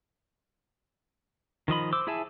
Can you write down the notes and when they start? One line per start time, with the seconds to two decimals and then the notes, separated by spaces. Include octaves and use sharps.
1.68 D#3 F3 D#5 B5
1.93 C5 D6 E6
2.07 E4 G#4 E5 G#5 A5